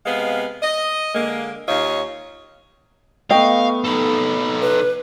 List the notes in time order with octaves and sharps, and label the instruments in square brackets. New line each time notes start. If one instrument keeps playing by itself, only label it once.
[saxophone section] C3 G#3 B3 F5
D#5
D3 G#3 A#3
D#2 F4 C#5 D#5 F5
[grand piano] A3 B3 [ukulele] D#5 G5 [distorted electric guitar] F5 [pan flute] C#6
[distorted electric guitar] D#4 A4 [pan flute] B5
[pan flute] B4